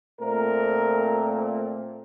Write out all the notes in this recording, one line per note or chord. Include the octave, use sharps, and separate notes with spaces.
A#2 A3 C4 A#4